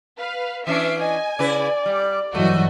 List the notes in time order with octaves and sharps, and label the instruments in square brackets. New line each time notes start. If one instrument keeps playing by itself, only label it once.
[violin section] B4 F5
[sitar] E3 C#4 D4 [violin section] E5 C7 D7
[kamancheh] D#5 [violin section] G#5
[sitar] C#3 E4 B4 [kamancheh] D5
[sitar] G3
[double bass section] G2 E3 F#3 [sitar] A3 [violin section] F#4 D#5